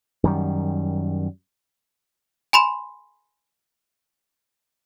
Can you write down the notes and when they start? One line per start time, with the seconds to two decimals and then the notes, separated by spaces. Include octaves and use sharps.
0.23 F#2 D#3 G3
2.53 G#5 B5 C6 E7